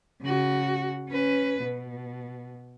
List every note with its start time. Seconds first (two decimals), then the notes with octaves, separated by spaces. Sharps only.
0.21 C#3 F#4
1.09 C#4 B4
1.63 B2